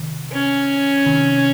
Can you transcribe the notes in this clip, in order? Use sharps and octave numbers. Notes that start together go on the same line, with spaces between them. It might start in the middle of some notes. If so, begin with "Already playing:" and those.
Already playing: C3 D#3
C#4
C3 D#3